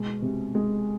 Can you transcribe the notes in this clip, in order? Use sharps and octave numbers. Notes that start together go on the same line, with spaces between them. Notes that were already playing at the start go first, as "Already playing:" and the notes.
Already playing: B2 G#3
C3
G#3